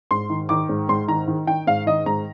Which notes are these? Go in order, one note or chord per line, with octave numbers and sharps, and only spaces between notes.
G#2 C6
D#3
D#3 D6
G#2
G#2 C6
D#3 A#5
D#3
D#3 G5
G#2 F5
D#3 D#5
G#2 A#5